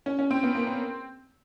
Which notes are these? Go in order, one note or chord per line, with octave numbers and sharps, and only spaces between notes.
C#4
C#4
C4
B3
A#3
C4